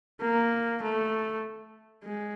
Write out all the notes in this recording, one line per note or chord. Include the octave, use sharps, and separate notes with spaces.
A#3
A3
G#3